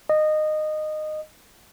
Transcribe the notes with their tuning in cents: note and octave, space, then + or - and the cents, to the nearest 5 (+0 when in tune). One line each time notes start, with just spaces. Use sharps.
D#5 -15